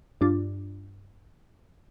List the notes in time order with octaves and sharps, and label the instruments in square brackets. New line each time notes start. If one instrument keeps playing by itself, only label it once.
[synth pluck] G2 D4 F4